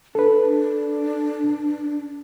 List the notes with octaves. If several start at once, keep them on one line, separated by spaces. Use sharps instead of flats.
D4 A4 B4